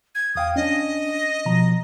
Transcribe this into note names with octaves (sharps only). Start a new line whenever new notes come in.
G#6
E2 F5 G5 D#6
C#4 D4 D#5
B2 F3 A#5